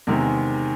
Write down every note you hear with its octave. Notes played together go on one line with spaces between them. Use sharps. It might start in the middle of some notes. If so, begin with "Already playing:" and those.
E2 C3 D#3 G#3